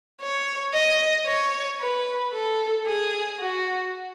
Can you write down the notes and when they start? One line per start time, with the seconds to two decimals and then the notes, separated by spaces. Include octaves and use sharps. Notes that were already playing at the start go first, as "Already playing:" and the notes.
0.21 C#5
0.74 D#5
1.27 C#5
1.80 B4
2.33 A4
2.87 G#4
3.39 F#4